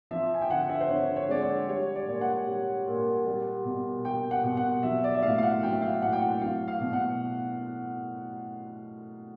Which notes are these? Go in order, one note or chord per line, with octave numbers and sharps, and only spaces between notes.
F3 E5
G#5
G5
D3 F#5
E5
C5
D3 C#5
C#5
G#3 D5
C#5
G3 C#5
D5
A#2
F#5
G3
A#2
G3
B2
G3 G5
F#5
B2
F#5
F#3 E5
D5
E5
A2 F5
F5
F#5
F#3 G5
E5
F5
A2 F#5
G5
F#5
F#3 F5
F5
B2
F#5